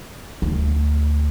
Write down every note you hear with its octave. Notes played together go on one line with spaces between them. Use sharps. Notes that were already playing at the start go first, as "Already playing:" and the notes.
D2